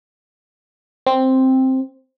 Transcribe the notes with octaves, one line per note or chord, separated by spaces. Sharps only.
C4